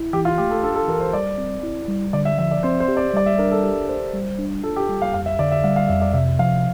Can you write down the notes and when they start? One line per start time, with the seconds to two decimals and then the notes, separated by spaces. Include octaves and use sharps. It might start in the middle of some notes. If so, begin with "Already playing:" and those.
Already playing: E4
0.13 E3 G4
0.25 F4
0.38 A3 G4
0.51 A4
0.63 D4 A4
0.75 A4
0.88 E3 A#4
1.00 C5
1.13 G3 D5
1.38 C4
1.63 E4
1.88 G3
2.13 D3 D5
2.25 E5
2.38 F3 E5
2.51 D5
2.63 C4 C5
2.80 C5
2.88 G4
2.97 D5
3.14 G3 D5
3.26 E5
3.38 D4 A#4
3.52 A4
3.63 G4
3.89 C5
4.14 G3
4.39 D4
4.63 F4 A4
4.76 G4
4.89 G3
5.02 F5
5.14 F2 F5
5.26 E5
5.39 D3 D5
5.51 E5
5.64 G3 F5
5.76 F5
5.89 F2 E5
6.02 D5
6.13 C3 E5
6.39 F3 F5